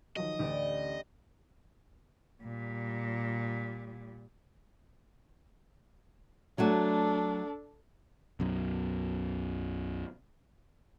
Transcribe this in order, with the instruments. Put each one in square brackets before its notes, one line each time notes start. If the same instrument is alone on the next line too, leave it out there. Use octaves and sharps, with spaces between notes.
[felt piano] D#3 F3 F#3 [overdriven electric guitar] D#5
[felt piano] A1 D2 [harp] G4 B4 D5
[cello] A#2 G3
[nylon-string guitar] F#3 A3 F#4 [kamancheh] D4 A4
[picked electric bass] B1 F#2